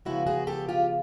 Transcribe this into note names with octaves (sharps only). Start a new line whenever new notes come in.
C#3 F3 G#3 B3 E4 F#4
F#4 G#4
G4 A4
F4 G4